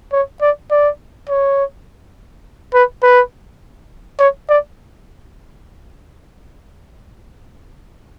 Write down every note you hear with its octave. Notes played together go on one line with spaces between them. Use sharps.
C#5
D5
D5
C#5
B4
B4
C#5
D5